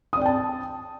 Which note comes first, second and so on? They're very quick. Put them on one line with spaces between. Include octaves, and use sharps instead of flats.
D#6 D5 G5 A5